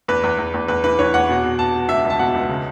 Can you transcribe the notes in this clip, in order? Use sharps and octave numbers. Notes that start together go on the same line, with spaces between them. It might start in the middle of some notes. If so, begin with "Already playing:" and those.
E2 B4
E2
E2
E2
E2 B4
E3 B4
E3 C#5
E2 F#5
B2
B2
B2 A5
B2
C#2 E5
C#2
A5
B2 F#5
C#2
C#3